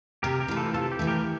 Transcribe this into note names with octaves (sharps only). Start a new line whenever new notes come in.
C3 G4 A#4
G4 A#4
E3 A3
F4 A4
C3 F4 A4
G4
E3 A3
G4 A#4